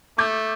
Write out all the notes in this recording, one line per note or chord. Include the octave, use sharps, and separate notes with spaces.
A3 D6 G6